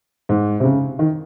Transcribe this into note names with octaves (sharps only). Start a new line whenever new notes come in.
G#2
C3
C#3
D#3